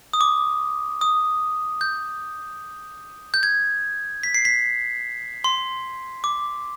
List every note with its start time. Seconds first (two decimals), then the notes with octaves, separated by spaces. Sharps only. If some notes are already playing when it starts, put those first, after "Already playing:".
0.13 D#6
0.21 D6
1.01 D#6
1.81 G6
3.34 G6
3.43 G#6
4.23 B6
4.34 C7
4.45 B6
5.44 C6
6.24 D6